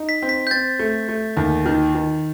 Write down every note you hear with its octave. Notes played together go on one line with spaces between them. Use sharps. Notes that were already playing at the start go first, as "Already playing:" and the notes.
Already playing: D#4
B6
C4
B6
G6
C4 A6
A3
A3
D#2
D#3
D#3